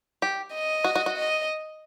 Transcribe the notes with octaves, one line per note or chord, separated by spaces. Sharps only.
G4
D#5
F#4
F#4
F#4
D#5